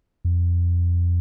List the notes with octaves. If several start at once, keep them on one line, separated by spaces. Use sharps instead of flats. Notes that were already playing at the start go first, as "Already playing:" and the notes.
F2